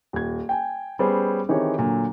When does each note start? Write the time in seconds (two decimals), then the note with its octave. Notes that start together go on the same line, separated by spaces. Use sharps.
0.13 D#1 G#6
0.49 G5 G#5
0.99 G3 B3 C#4 G#4 C5
1.49 D#3 E3 C4 G4 G#4 C#5
1.78 A#2 D3 F#3